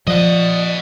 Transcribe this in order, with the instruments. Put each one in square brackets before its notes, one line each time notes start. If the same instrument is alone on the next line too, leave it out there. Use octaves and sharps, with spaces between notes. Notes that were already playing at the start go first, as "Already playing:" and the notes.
[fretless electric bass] F3 [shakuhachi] D5 [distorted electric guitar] D#5 F#5